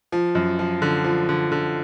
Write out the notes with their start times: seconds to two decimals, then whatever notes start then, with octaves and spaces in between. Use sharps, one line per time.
0.12 F3
0.35 F#2
0.59 F3
0.82 D3
1.04 F3
1.29 D3
1.52 D3